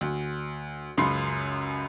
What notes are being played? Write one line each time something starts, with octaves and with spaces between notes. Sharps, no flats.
D2
C#2 F#2 B5 C6 C7